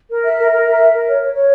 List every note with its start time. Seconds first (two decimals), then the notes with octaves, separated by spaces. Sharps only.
0.09 A#4
0.22 E5
0.37 A#4
0.50 A#4
0.65 E5
0.78 A#4
0.92 A#4
1.07 C#5
1.21 C#5
1.34 C#5